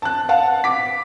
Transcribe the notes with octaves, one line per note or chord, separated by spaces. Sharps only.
A5 F#6
F5 F#5 A5
D6 B6